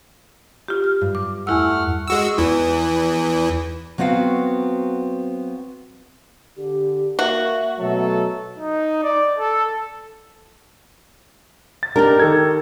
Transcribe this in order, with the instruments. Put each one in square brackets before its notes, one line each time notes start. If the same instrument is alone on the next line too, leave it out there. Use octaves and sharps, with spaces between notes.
[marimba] F4 G4
F6
[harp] G2
[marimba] D6
[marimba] E2 E4 E6 [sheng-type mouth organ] A3 F#5 F6
[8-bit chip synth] G#3 F#4 E6
E2 E3
[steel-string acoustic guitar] F#3 B3 C4 F#4 F5
[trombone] D3 [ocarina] G4
[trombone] A#3 [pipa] F#4 [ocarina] E5
[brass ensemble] B2 A3 A4 [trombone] F#3
[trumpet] D#4
D5
A4
[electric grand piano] A6
[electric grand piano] D4 [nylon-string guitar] D#4 G4 A#4
[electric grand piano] D#3 A4 G#6